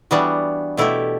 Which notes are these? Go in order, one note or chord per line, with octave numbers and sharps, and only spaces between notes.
E3 G3 B3 D4 F#4
B2 A3 E4 G4